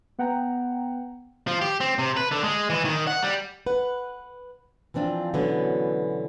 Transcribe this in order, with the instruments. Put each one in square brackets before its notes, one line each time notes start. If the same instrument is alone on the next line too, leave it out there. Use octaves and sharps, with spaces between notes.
[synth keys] B3 F#5 G5 A#5
[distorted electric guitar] F3
G4
C4
C3
B4
D3
G#3
E3
D#3
F#5
G3
[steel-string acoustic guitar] B4 F#5
E3 F3 C4 D4 F4
B2 D3 E3 F#3 B3 C#4